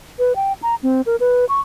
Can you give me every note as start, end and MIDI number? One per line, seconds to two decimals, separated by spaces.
0.19 0.36 71
0.36 0.53 79
0.63 0.75 82
0.83 1.01 60
1.06 1.16 70
1.20 1.45 71
1.49 1.60 85